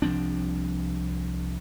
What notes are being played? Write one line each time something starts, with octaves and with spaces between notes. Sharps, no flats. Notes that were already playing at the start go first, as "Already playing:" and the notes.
C2 F3 C4 D4